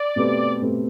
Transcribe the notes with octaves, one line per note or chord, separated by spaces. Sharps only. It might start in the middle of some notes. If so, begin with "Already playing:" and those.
Already playing: D5
B2 A3 C4 G4 B4
B2 A3 C4 G4 B4